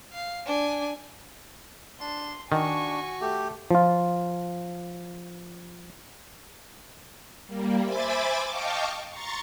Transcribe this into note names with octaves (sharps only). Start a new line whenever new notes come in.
F5
D4 G#5
D4 C6
D#3 D4 F#4 G#5 C#6
A3 G4
F3 F4
G3 A#3
C5 E5 G#5 B5 D6 A6
D#5 F5 G5 A5 C#6 D6
A#5 C6 C#6 A6